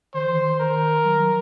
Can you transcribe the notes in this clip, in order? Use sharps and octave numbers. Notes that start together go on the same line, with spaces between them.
D#3 C5
E3
D#3
A#4
F#3
F#3